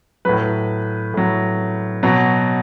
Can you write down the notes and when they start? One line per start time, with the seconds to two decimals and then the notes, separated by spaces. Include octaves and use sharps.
0.25 A2 F#3 B4
1.14 A2 F#3
2.03 B2 F#3